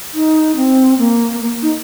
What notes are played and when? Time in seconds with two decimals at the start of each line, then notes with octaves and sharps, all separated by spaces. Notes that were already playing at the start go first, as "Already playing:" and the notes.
0.14 D#4
0.56 C4
0.99 A#3
1.41 A#3
1.62 D#4